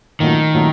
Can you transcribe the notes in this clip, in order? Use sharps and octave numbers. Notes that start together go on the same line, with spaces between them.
A#2 D#3 F#3 A3 C#4
A#2 F#3 A3 C#4